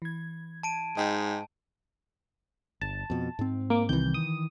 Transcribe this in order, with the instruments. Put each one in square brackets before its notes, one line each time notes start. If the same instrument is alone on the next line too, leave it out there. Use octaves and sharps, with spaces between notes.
[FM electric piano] E3 G#6
[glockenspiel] A5 D7 D#7
[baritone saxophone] G#2 [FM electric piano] D#5 G5 G6
[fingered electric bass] G1 [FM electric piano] A5
[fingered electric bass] F2 B2
G#2 C4
[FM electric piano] A#3 D6
[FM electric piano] C2 G6 [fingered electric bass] D#3 E3
[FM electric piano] D#6